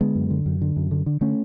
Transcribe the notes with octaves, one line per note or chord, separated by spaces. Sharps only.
D3 G#3 B3
F#2
D3
F#2
D3
F#2
D3
D3
D3 A3 C#4